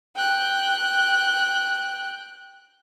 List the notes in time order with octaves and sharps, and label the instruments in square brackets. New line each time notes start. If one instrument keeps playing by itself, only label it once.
[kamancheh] G5 F#6